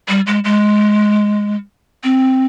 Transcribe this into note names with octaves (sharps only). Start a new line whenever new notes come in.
G3
G#3
G#3
C4